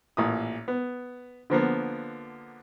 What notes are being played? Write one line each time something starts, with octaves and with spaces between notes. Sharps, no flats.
A1 A#2 D#6
B3
D3 F3 A#3 B3